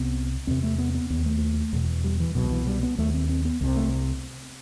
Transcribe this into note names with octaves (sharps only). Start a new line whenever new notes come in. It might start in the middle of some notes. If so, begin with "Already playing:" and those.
Already playing: C2 C3 B3
E2 C3 C4
A3
B3
B3
D#2 B3
A3
E2 B2
G3
E3
C2 B2 F#3
E3
G3
B3
D#2 A3
C4
C4
B3
C2 C3
A3